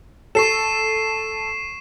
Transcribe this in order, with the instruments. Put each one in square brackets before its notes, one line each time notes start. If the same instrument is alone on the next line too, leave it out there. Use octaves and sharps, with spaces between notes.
[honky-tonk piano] A4 [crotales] C#6 C7 E7